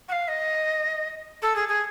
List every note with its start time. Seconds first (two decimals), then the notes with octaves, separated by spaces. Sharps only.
0.08 F#5
0.12 F5
0.28 D#5
1.42 A4
1.56 G#4
1.68 G#4